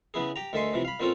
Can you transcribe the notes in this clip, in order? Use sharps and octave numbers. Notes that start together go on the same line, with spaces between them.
C#3 B3 E4 G#4
G4 G5 A#5
D2 D#3 A4 E5 G#5 C6
C3 E3 F3
F5 B5
A#2 A#3 C4 C#4 F4 A4